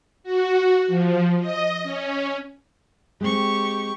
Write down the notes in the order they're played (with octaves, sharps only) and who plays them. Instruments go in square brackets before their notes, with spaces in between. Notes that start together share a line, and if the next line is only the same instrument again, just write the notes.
[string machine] F#4
F3
D#5
C#4
[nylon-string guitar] G#3 C4 [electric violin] G4 C#6